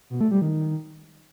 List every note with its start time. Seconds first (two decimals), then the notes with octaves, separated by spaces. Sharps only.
0.10 B2
0.21 A3
0.31 G3
0.42 D#3